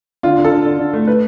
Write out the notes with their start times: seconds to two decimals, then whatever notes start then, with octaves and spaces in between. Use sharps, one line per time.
0.23 D3 F4
0.38 D3
0.44 A4
0.52 D3
0.66 D3
0.79 D3
0.93 A3
1.07 B4